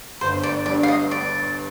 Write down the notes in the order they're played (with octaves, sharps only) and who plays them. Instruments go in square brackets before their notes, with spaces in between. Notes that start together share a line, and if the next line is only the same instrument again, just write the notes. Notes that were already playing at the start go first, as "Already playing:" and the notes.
[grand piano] G1 [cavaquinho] C5
[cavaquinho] D5
[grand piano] G2 [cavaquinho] D5
[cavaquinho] F5
D#5
D5